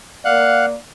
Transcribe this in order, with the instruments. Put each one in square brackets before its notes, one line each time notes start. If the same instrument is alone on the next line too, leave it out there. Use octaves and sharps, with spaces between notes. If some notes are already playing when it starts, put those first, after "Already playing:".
[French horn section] A#3 D5 [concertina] F5 F#5 F#6